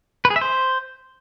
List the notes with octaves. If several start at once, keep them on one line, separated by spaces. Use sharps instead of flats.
B4
G#4
E5
C5